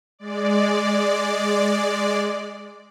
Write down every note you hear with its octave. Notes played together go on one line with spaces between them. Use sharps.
G#3 D5